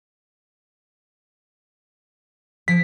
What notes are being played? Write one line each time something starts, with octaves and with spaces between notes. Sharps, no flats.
F3 B6